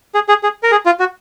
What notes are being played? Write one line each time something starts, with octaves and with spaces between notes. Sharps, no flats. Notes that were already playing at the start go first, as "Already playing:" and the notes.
G#4
G#4
G#4
A#4
G#4
F4
F#4